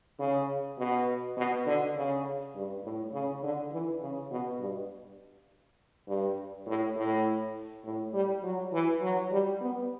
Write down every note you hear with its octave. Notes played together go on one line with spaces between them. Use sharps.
C#3
B2
B2
D3
C#3
G2
A2
C#3
D3
E3
C#3
B2
G2
G2
A2
A2
A2
G3
F#3
E3
F#3
G3
B3